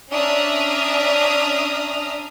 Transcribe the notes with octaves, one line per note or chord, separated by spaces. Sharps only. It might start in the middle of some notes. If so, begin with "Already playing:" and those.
C#4 D4 E5 A#5 D#6 F6